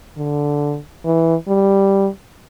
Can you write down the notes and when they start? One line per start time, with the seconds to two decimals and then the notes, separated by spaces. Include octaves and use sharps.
0.18 D3
1.05 E3
1.48 G3